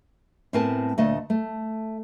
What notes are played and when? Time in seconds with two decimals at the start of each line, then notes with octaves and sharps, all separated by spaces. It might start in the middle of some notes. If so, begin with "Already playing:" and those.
0.53 A2 B3 C4 A#4 G#5 A5
0.98 D2 A#2 A3 D#5
1.30 A3